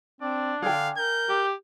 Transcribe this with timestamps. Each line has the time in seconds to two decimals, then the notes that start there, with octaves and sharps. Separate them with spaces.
0.21 C4 D4 D5
0.62 D3 G#4 F5 G5
0.98 A#4 G6
1.29 G4